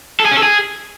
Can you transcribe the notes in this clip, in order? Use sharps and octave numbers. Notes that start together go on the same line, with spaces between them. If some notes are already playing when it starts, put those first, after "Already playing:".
A4
G#4
C#4
A4
G#4